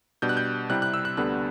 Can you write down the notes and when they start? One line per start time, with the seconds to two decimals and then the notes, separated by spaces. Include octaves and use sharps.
0.22 B2 G3 D4 G6
0.29 F#6
0.37 G6
0.70 C3 G3 C4 E4 F#6
0.82 F#6
0.94 E6
1.05 F#6
1.17 D2 D3 G3 B3 F#6